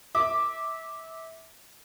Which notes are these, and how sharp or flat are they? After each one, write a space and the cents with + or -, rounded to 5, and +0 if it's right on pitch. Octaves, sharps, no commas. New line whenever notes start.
E5 -25 D6 +0